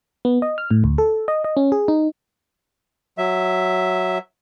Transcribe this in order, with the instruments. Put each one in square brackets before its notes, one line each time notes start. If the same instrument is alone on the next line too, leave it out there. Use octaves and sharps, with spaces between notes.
[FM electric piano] B3
D#5
F6
A2
D2
A4
D#5
D#5
C#4
G#4
D#4
[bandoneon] F#3 E5